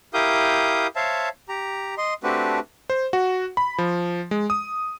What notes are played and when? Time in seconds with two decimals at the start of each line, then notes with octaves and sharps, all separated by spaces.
0.14 E4 G4 A#4 F5 D#6 G6
0.96 C5 C#5 E5 F5 A5
1.49 G4 A#5
1.98 D#5 C6
2.24 A3 C4 D4 F#4 G4 B4
2.90 C5
3.13 F#4
3.57 B5
3.78 F3
4.31 G#3
4.50 D#6